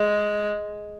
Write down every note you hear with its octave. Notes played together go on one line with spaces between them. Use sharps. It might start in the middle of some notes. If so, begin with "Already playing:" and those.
Already playing: G#3